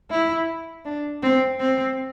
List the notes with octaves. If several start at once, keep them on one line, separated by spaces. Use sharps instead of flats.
E4
D4
C4
C4